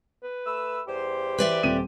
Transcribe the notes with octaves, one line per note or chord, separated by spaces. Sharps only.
B4
A3 B5 E6
E2 G3 G4 C5
E3 B4 D5 E5
D#1 F2 C4 G4 D#7